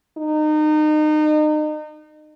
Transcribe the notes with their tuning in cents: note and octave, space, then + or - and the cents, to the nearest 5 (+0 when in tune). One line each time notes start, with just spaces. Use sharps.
D#4 -30